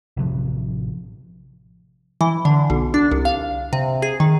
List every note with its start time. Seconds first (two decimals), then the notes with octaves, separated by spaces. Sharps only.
0.17 A1 C3 F3
2.21 E3
2.45 D3
2.70 B1
2.94 D4
3.11 C2
3.25 F5
3.73 C3
4.02 G#4
4.20 D#3